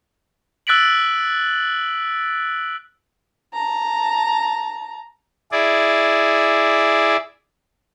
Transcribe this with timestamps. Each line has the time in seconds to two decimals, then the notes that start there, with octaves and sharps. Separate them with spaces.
0.67 E6 F#6 A6 B6 D7 F#7
3.54 A5 A#5
5.52 E4 G#4 D5